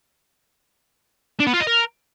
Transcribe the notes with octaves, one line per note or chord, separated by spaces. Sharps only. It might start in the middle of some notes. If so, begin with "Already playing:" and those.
D4
B3
F4
D#5
A#4